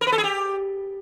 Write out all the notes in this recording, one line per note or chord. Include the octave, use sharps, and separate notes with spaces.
A#4
B4
A4
G#4
G4